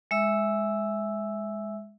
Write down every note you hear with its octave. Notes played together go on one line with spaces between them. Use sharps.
G#3 E5 E6